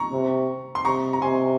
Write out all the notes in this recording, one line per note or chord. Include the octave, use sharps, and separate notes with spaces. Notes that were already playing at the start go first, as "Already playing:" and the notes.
Already playing: A#5 C#6
C3
C6
C3 A#5 C#6
A#5
C3 G#5 C6